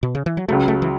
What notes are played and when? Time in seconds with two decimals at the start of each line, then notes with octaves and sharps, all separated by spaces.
0.03 B2
0.15 C#3
0.26 E3
0.37 F#3
0.48 C#2 C#3 F#3 A3
0.68 A3
0.82 E3